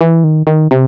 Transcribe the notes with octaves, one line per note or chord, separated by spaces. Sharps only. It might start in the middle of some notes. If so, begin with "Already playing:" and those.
E3
D#3
D#3
C3